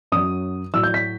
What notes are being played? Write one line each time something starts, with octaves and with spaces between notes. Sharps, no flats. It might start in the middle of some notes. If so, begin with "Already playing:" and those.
F#2 F#3 D#6
A2 F#3 E6
G6
B6